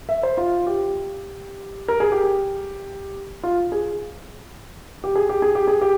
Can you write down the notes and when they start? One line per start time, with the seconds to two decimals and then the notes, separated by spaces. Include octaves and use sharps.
0.09 E5
0.23 C5
0.38 F4
0.67 G4
1.88 A#4
2.00 G#4
2.12 G4
3.43 F4
3.72 G#4
5.04 G4
5.16 G#4
5.29 G4
5.42 G#4
5.55 G4
5.68 G#4
5.81 G4